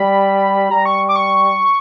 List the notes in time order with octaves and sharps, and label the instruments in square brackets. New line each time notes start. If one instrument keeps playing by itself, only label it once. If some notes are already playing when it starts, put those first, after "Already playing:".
Already playing: [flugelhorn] G3 [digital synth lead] B5
[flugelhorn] G3 [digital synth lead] A#5
[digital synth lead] C#6
D6
C#6